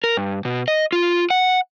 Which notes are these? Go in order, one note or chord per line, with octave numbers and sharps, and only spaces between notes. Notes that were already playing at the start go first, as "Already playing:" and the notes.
A#4
G2
B2
D#5
F4
F#5